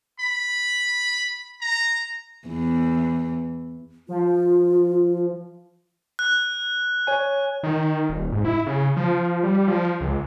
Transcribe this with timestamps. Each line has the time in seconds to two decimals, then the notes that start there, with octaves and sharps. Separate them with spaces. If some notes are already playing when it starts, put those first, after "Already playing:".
0.20 B5
1.61 A#5
2.48 E2
4.09 F3 F4
6.19 F#6
7.07 C#5 G#5
7.63 D#3
8.10 D#1
8.32 G#2
8.45 E4
8.67 C#3
8.97 F3
9.43 G3
9.68 F3
10.01 C#2